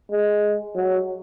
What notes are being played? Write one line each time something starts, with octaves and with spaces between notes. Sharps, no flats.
G#3
F#3